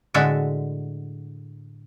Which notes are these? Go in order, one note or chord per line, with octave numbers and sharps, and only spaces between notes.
A2 D3 G#3 F#4 A4 E5